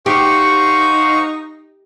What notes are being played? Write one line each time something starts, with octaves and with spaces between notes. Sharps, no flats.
D#4 G4 C5 F5 F#5 C#6